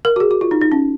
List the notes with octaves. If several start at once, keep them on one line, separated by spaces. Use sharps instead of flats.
A#4
F#4
G#4
F#4
F4
D#4
D#4
C#4